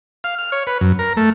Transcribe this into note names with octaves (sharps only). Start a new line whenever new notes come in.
F5
F6
C#5
B4
F#2
A#4
A3